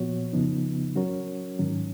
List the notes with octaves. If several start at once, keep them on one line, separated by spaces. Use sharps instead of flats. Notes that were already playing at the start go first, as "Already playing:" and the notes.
Already playing: A#2 F3 B3 F#4 C#5
F2 C#3 F3 B3 D#4
F#3 C#4 F#4 A#4 C#5
G#2 D#3 F#3 C#4